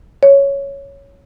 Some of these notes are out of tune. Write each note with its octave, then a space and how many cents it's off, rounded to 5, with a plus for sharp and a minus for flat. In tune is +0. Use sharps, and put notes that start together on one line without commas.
C#5 +5